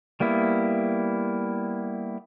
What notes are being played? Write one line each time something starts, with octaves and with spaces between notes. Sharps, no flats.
G3 A#3 B3 E4